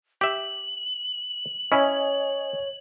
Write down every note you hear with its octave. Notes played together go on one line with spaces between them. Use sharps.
G4 E5 F#7
C#4 E4 C#5 D#5 G#5